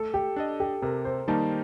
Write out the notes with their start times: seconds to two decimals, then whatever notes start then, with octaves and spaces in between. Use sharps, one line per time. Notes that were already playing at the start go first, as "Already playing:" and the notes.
Already playing: A3 A4
0.14 G4
0.36 D4 A4 D#5
0.60 G4
0.82 C3 A#4
1.05 C5
1.28 D#3 G3 A#3 D#4 A5